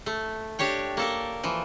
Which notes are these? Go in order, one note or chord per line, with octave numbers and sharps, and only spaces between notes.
A3
D4 G4 C#5 G5
A#3 A4 A#4
E3 F3